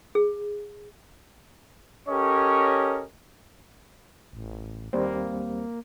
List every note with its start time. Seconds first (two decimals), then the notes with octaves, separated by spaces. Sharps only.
0.15 G#4
2.08 C#4 G4 A4 A#4 C#5 D#5
4.33 A1
4.93 D#2 G3 A#3 C4